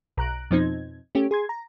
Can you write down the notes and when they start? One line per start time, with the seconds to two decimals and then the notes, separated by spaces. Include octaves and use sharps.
0.17 B1 A#5 F#6 D7
0.51 F2 B2 F3 C4 D#4 G#6
1.15 A3 C#4 G4
1.31 G#4 C6 G#6
1.49 A#5